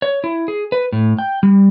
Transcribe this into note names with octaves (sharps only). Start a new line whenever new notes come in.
C#5
E4
G#4
B4
A2
G5
G3